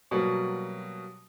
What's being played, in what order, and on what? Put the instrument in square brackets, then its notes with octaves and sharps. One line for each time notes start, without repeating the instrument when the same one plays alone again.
[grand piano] B2 F#3 G3 A#3